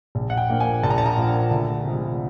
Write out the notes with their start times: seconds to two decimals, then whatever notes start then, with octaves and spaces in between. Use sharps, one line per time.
0.15 A#1
0.30 F#5
0.37 G5
0.49 A#2 F3 A#3 D4
0.60 G#5
0.83 A#1 A5
0.90 A#5
0.98 A5
1.06 A#5
1.17 A#2 F3 A#3 D4
1.51 D2
1.85 C3 F3 G#3